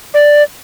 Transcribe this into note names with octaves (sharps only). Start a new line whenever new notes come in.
D5